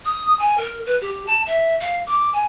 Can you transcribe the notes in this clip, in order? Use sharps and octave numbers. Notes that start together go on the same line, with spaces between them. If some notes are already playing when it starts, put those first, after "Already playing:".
D#6
G#5
A#4
B4
G4
A5
E5
F5
D6
G#5